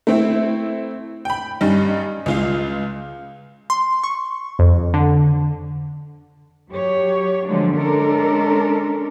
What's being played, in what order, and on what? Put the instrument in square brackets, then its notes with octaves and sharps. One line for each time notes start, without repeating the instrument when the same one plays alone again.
[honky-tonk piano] A3 C4 E4
G5 B5
G2 G3 C#4 D#4
C#2 F4 F5
[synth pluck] C6
C#6
F2
D3
[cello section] F#3 G4 C#5
D3 F3 F#3 G#3 A#3 D4
G#3 C#4 D4 A4 A#4